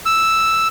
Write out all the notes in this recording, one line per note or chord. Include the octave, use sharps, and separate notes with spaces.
E6